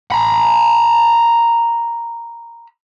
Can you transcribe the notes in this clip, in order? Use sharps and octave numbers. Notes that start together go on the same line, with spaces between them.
A#5 B5